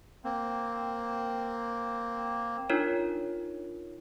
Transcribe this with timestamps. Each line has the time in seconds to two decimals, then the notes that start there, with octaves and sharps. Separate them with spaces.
0.24 A#3 C4
2.69 D4 D#4 F4 A#4 C#5